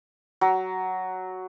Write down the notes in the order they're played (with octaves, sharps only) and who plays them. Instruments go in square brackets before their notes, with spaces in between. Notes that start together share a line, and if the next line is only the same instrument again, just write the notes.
[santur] F#3